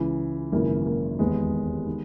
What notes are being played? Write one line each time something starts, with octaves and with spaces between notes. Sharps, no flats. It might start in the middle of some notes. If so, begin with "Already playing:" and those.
Already playing: C#2 C#3 E3
G#1 F#2 C#3 E3 A#3
A#3
E1 D#2 D#3 G#3 B3
D#3